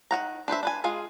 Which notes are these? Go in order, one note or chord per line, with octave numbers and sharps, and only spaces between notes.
D#3 F#3 F#5 A#5
D4 B4 C5 E5
D4 B4 G#5
G#3 F4 G#4 F5